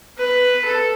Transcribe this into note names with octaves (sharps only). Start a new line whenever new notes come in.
B4
A4